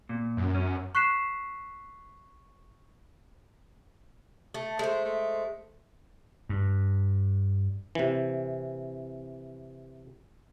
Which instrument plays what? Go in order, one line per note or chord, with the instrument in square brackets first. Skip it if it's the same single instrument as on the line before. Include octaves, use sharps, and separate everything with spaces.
[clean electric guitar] A#2
[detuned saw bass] F#2
[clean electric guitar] C#4
[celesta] C#6 F#6 B6 C7 E7
[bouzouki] A3
[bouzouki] G#3 C5 [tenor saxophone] A3
[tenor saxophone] A3
[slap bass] G2
[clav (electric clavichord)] C3 E3